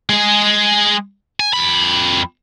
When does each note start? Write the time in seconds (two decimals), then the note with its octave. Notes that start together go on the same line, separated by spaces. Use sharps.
0.09 G#3 G#4
1.40 G#5
1.53 F2 B5